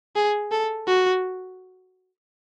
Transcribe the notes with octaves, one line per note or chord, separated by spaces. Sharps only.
G#4
A4
F#4